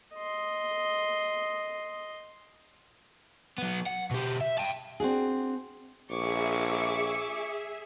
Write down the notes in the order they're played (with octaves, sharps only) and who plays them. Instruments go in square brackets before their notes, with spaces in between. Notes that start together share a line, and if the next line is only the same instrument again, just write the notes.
[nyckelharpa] D#5 C6
[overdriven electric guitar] F#3 B3
F#5
B2 G4
E5
G5 A5
[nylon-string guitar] C4 D4 F#4 G#4
[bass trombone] A#1 [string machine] G#4 E5 [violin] C#6 D6